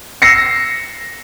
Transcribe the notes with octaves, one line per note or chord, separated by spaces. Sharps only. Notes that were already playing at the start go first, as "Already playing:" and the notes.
E6 A#6 C7 C#7